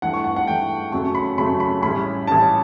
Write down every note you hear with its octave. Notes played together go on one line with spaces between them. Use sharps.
G2 E3 A3 F#5
C#6
F#5
F#5
G2 E3 A3 G5
F#2 C#3 F#3 A3 C#6
B5
F#2 C#3 F#3 A3 B5
B5
A1 A2 G3 C#4 B5
A1 A2 G3 C#4 A5